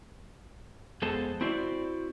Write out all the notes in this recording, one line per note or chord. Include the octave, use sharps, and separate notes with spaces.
F2 G#3 B3 A4 C5 A5
C4 E4 F#4 C5 D5